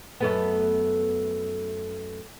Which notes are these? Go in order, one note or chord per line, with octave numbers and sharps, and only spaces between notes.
F#2 A3 B3